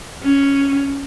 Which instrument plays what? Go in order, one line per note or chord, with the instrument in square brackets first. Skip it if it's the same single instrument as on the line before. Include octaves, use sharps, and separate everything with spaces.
[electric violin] C#4